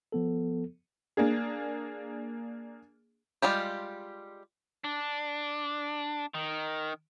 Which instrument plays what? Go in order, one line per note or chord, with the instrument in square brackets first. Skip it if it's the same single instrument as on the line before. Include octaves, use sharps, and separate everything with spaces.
[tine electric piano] F3 B3 A4
[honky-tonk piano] A#3 D4 G#4
[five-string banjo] G3 G#3 F4 G4
[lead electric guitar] D4
D#3